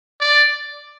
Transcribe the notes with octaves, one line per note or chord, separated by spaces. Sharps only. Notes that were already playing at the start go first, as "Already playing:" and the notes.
D5